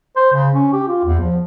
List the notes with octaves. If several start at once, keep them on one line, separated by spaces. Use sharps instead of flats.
C5
C#3
C#4
G4
F4
E2
F3